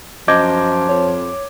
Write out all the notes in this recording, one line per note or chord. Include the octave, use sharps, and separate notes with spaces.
F#2 F3 D#5 D6 G6 G#6
F2 C#5